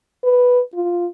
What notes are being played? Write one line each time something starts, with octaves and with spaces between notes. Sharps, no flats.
B4
F4